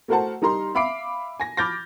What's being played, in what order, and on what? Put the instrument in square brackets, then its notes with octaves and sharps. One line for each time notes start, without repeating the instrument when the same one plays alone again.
[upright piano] A3 F#4 A#4 C5 F#5 A5
G3 D#4 A#4 A#5 C6
E5 F5 B5 D6 C7 D7
G#5 A#6
B5 D6 F6 G6 A6 A#6